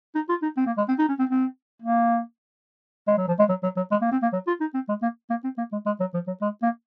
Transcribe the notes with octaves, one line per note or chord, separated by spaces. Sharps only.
D#4
F4
D#4
C4
A#3
G#3
C4
D#4
C#4
C4
C4
A#3
G#3
F#3
F3
G#3
F#3
F#3
F#3
G#3
A#3
C4
A#3
F#3
F4
D#4
C4
G#3
A#3
A#3
C4
A#3
G#3
G#3
F#3
F3
F#3
G#3
A#3